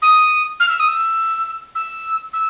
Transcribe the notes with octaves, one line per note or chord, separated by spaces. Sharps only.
D#6
F6
E6
D#6
E6
E6
E6